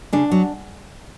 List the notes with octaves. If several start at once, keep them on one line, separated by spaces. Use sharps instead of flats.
C#3 D4
F#3